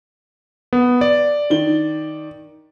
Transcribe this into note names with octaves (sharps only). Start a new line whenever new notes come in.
B3
D5
D#3 G7